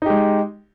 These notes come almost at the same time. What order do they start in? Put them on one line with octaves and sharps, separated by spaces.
D#4 G4 G#3